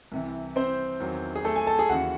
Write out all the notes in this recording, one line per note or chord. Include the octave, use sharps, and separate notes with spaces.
C2 C3 E3
C4 C5
E2 D#3 F#3
G#4
A3 A4
G#4 G#5
A4 A5
G#4 G#5
D#2 C#3 E3 F#4 F#5